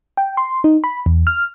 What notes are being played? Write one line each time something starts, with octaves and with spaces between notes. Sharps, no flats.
G5
C6
D#4
B5
E2
F6